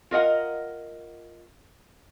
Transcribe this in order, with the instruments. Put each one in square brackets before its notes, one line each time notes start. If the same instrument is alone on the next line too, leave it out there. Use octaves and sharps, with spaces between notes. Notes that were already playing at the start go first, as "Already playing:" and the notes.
[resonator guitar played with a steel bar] F4 A#4 D#5 F#5